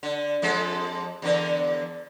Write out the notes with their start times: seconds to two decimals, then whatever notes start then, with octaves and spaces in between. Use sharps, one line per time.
0.03 D3
0.42 F2 G#3 A4
1.22 E2 D3 A#4